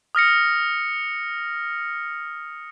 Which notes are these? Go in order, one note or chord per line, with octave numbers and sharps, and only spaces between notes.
D#6 F6 A#6 C#7